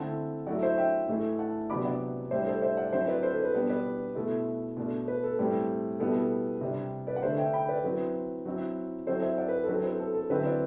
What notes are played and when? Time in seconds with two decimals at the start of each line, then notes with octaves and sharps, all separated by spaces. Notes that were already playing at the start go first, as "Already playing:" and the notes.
Already playing: D3 A3 C4 E4 F#5 A5
0.47 F#3 A3 E4 D5 F#5
0.62 C5 E5
0.77 E5 G5
1.08 A2 E3 A3 E4
1.39 F#5 A5
1.70 C3 F#3 B3 D4 B5 D6
1.85 D5 F#5
2.31 A2 G3 D4 C5 E5
2.46 A4 C5
2.62 C5 E5
2.77 D5 F#5
2.93 F#3 C4 E4 C5 E5
3.08 B4 D5
3.23 A4 C5
3.33 B4
3.44 B4
3.54 B2 G3 B3 D4
3.69 B4 D5
4.15 B2 A3 E4
4.77 B2 A3 D4
5.08 B4
5.23 A4
5.38 A2 G3 C4 A4
6.00 B2 G3 B3 E4 A4
6.15 A4
6.61 C3 G3 D4
7.07 B4 D5
7.16 F#5
7.22 D3 A3 D4 C5 E5
7.38 E5 G5
7.53 G5 B5
7.69 B4 D5
7.84 F#3 C4 E4 B4
8.45 F#3 C4 E4
9.07 F#3 C4 E4 A4 C5
9.22 C5 E5
9.38 D5 F#5
9.48 B4
9.64 A4
9.68 F#3 C4 E4 B4
9.84 A4 C5
10.00 A4
10.14 A4
10.30 D3 F#3 C4 E4 B4
10.45 B4 D5